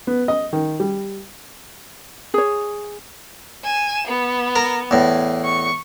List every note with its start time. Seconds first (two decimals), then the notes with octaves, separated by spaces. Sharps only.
0.07 B3
0.28 D#5
0.53 D#3
0.80 G3
2.34 G#4 C#5
3.64 G#5 E7
4.08 B3
4.55 A#4 A#5
4.91 E2 A2
5.45 C#6